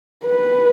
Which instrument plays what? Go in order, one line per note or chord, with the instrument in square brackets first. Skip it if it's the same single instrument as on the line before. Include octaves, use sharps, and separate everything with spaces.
[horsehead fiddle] B4